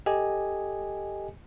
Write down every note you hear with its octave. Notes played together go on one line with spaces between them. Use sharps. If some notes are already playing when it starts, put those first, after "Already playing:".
G4 A4 D#5 G#5